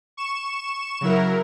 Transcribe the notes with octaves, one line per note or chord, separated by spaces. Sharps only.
C#6 E7
C#3 F#3 E4 A#4